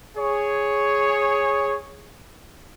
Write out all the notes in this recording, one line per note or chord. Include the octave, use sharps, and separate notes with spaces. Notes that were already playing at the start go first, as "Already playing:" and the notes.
G#4 C#5